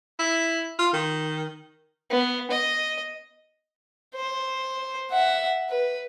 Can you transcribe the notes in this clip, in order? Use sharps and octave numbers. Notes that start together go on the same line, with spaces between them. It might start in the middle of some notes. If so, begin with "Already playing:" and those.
E4
F4
D#3
B3
D#5
C5
E5 F#5
B4